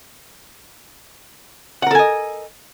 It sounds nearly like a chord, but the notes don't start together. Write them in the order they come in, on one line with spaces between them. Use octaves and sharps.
F#5 A#4 A4 G#5 D#5